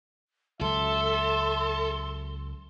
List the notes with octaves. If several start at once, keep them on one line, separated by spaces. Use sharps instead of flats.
C#2 F#3 A4 E5 C6